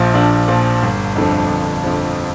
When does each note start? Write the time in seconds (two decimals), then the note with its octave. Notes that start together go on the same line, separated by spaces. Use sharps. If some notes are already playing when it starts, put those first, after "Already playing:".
Already playing: A#1 A#2 F3
0.14 A#1 D4
0.48 A#2 F3
0.83 G1
1.15 F2 D3 F3
1.49 G1
1.84 F2 D3 F3